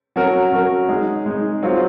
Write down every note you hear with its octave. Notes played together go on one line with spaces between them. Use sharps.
F#3 C#4 F#4 A#4
F#3 C#4 F#4 A#4
G#3 D#4 G#4
G#3 D#4 G#4
F#3 C4 F4